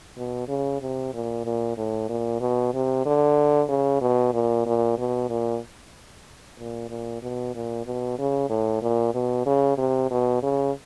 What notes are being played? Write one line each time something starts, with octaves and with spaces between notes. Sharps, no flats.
B2
C#3
C3
A#2
A#2
A2
A#2
B2
C3
D3
C#3
B2
A#2
A#2
B2
A#2
A#2
A#2
B2
A#2
B2
C#3
A2
A#2
B2
C#3
C3
B2
C#3